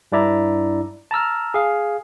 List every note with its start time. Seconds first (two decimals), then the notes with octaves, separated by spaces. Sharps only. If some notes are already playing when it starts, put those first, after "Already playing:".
0.12 G2 D4 E4 D5 E5 A#5
1.11 A5 A#5 E6 F6
1.54 G#4 F5